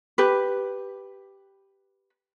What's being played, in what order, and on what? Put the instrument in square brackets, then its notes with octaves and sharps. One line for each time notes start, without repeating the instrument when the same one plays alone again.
[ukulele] G4 B4